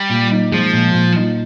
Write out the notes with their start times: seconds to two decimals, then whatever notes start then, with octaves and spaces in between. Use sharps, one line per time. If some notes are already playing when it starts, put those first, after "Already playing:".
Already playing: G3
0.10 A#2
0.31 D#4
0.52 F3 G#3
0.73 A#2
0.94 A#2
1.16 D#4